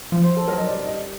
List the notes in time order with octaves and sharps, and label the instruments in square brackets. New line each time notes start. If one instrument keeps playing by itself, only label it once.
[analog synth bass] F3
[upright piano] C5
A4
[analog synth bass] F#3 [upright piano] A#4
[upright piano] D#5
[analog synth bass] G3 [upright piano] D5
[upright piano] D#5